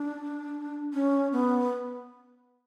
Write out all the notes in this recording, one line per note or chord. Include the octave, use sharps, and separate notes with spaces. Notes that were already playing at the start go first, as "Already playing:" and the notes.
Already playing: D4
C#4
B3